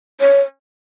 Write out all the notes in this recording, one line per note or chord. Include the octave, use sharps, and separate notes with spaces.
C#5